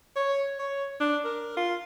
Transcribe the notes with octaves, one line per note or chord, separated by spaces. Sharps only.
C#5
C#5
D4
A#4
F4